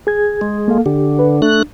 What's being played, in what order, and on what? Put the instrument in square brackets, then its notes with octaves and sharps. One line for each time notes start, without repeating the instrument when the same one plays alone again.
[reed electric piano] G#4 G#6
[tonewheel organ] G#3
[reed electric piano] A#3 A4 F5
[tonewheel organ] D3 [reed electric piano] G4
[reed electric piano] B4
[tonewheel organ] A3 F#6 [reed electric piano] D4